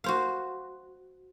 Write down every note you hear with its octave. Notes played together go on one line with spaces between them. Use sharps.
F#4 C5 F5